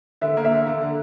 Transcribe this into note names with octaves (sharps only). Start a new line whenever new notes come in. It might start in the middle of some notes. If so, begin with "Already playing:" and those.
D3 E5
A#3
E5
D3
D3
D3